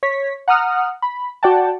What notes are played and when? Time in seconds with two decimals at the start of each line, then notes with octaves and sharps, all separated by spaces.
0.03 C#5 B6
0.48 F#5 A#5 D#6 F6
1.02 B5
1.43 F#4 D5 F#5 G5 A5